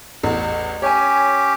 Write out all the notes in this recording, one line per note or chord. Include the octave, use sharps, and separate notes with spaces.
A1 E2
C#4 G4 C#5 G#5